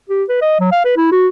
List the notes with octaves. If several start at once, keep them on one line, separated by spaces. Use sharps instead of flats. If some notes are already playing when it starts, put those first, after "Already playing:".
G4
B4
D#5
F#3
F5
B4
E4
F#4